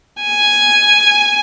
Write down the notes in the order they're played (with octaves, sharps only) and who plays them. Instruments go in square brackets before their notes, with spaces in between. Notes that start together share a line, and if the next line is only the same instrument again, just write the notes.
[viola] G#5